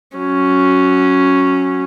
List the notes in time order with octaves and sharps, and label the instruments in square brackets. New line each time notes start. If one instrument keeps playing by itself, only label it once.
[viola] F#3 C#4